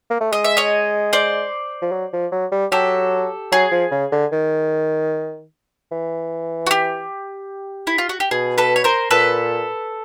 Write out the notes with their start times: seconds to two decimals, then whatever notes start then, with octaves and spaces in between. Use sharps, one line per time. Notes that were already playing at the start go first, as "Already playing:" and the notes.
0.10 A#3
0.20 A3
0.32 G#3 D#5
0.44 E5
0.57 C#5 D#5
1.13 C5 D5
1.82 F3
1.92 F#3
2.13 F3
2.31 F#3
2.52 G3
2.71 F#3 G4 A4
3.52 F#3 G#4
3.71 F3
3.91 C#3
4.12 D3
4.32 D#3
5.91 E3
6.67 F#4
6.71 G4
7.87 E4
7.98 F4
8.09 F#4
8.20 G4
8.31 B2 G#4
8.58 A4 B4
8.76 C#5
8.84 A#4 C5
9.11 A#2 A4 B4